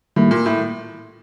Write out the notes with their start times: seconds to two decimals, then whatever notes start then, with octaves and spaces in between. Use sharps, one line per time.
0.16 A2 D#3 G3 A#3
0.31 A#2
0.46 A2